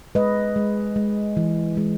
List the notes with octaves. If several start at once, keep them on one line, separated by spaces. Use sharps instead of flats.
G#3 B4 D#5
G#3
G#3
E3
G#3